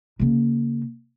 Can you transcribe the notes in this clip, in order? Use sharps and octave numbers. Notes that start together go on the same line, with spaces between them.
C#3 A#3